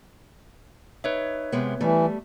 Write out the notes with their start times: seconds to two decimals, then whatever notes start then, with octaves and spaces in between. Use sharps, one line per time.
1.04 D#4 B4 C#5 E5
1.52 C3 G#3 B3
1.81 E3 G3 A3